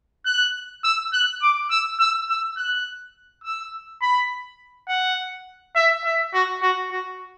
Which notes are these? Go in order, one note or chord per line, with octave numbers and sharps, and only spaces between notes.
F#6
E6
F#6
D6
E6
E6
E6
F#6
E6
B5
F#5
E5
E5
F#4
F#4
F#4